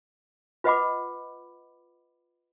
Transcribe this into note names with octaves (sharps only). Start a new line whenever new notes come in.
F4 B4 D#5 F#5 B5 D6